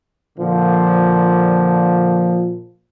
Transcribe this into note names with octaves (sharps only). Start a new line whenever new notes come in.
A#2 D3 F3